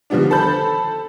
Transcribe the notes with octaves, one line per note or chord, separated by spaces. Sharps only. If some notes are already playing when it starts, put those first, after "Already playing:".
D3 D#3 F3 G3 B3 D4
A4 C5 A5 B5 G6